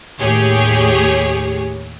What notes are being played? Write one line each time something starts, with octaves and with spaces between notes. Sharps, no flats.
D#2 A2 G4 G#4 C#5